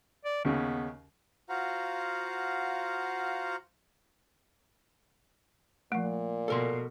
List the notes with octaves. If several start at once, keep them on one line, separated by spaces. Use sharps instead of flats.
D5
D#2 C#3 B3
F4 F#4 C5 F5 F#5 A#5
A#2 F3 A3
B2 A4 A#4 C6